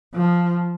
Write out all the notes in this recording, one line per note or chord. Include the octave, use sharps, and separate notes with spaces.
F3